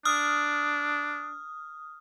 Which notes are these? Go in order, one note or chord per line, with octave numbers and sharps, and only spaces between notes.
D4 D#6 F6